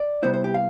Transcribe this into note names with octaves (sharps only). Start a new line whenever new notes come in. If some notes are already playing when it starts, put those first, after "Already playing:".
Already playing: D5
C3 G3 B3 E4 C5
C5
G4
F5